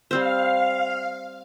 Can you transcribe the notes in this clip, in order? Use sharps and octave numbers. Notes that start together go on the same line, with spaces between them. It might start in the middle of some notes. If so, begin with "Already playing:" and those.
G3 C4 C5 F5